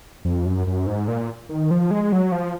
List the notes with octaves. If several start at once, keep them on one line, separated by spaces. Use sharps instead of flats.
F2
F#2
F#2
G#2
A#2
D#3
F3
G#3
F#3
F3